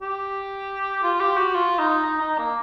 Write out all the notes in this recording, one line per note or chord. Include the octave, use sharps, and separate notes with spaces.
G4
F4
G4
F#4
F4
D#4
D#4
D#4
A#3